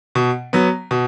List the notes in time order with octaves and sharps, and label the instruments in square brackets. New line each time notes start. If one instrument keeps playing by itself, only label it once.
[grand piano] B2
F#3 B3
B2